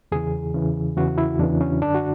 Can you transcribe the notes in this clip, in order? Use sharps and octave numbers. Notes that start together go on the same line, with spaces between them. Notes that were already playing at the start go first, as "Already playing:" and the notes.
E2 C#3 E3 G#4
E2 C#3 E3
E2 C#3 E3 F#4
E4
E2 C#3 E3 D4
C#4
F#2 D3 D4
F#4